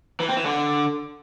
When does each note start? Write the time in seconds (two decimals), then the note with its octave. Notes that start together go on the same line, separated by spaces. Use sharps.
0.20 E3
0.29 C4
0.37 E3
0.46 D3